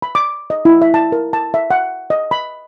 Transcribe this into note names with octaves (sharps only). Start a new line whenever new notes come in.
B5
D6
D#5
E4
E5
A5
A#4
A5
E5
F#5
D#5
B5